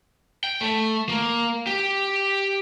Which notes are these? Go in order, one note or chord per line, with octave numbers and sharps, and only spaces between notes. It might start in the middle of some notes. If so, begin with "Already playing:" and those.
G5
A3
A#3
G4